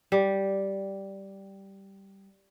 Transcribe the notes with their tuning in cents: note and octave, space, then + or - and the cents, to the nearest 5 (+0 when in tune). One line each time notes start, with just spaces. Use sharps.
G3 -5 G4 +0